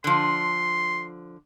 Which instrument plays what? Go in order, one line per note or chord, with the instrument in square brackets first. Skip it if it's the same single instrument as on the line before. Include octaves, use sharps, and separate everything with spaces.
[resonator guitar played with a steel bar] D3 F3 [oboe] C6